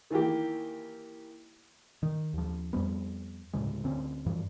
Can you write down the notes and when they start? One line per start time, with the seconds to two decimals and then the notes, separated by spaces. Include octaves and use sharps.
0.10 D#3 E3 A#3 G4
2.03 D#3
2.34 D#2 F3
2.73 F2 F3 G3 B3
3.53 D2 A2 C#3 G#3
3.84 D2 C4 C#4
4.26 G2 E3 F3